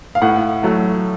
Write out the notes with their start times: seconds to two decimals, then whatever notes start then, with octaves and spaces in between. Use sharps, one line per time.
0.15 F5
0.22 A2 F#5
0.63 F#3 A3